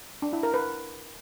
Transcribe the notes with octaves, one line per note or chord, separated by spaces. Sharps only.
D4
E4
A#4
B4